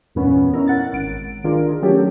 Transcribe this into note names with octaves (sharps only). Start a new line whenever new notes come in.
E2 G2 A#2 E3 B3 C#4
C#4 D#4 E4 A#4
A#4 F#5 A6
G#1 D7
D#3 D4 F4 G#4 A#4
F#3 A3 C#4 G4 A4 C#5